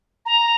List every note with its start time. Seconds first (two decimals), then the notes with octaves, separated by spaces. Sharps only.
0.26 A#5